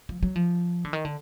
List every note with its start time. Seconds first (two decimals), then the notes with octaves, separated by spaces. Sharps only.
0.09 F3
0.23 F#3
0.36 F3
0.85 D3
0.93 D#3
1.05 D3